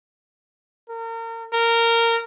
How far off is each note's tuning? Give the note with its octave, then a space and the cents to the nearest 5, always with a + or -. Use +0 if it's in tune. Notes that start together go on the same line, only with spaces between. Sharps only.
A#4 -35
A#4 -15